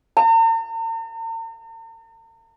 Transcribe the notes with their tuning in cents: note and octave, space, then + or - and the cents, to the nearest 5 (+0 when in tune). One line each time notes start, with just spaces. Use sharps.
A#5 -45